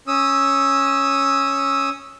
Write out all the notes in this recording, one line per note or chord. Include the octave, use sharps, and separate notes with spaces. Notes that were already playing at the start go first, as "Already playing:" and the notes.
C#4 D#6 E6